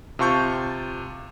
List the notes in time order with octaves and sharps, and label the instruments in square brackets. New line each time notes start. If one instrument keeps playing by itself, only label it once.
[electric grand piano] C3 F4 A5 C#6 G6